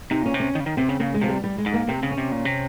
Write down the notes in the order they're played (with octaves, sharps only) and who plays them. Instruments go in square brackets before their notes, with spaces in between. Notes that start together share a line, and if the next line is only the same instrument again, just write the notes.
[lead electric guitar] C3 [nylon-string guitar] D#4
[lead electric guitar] A#2 [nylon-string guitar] C#4
[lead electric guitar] C3
[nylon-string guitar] C#4
[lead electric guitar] D#3
C#3
D#3
[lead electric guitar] C3 [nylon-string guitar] C4
[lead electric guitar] C#3
[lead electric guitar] C#3 [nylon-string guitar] A#3
[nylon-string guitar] G#3
[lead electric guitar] C3 [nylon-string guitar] F3
[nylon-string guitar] G3
G3
G#3
[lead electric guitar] G#2
[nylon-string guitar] A#3
[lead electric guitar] C3 [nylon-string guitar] C4
[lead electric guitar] C#3
[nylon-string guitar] C#4
[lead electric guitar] C3
A#2
C3